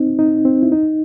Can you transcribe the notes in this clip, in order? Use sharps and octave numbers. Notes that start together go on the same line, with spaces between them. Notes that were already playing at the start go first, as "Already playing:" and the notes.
Already playing: C4 D#4
D#4
C4
E4
D#4